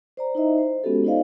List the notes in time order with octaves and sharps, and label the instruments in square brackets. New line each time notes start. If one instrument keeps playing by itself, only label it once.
[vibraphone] C5 D5 A#5
D#4 E4 C5 D#5 E5
C5
G#3 B3 C#4 F#4 G4 A4
D#4 F4 C5 D5 D#5 F5